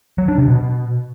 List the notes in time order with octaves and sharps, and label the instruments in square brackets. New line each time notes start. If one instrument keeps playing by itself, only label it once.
[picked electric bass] F#3
D4
C3
B2